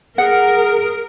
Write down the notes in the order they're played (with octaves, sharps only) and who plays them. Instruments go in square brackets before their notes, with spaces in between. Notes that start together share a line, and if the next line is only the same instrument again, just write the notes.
[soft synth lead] G#4 [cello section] A#4 [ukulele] F#5